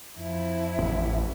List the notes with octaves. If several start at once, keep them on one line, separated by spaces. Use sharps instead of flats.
F2 E4
A1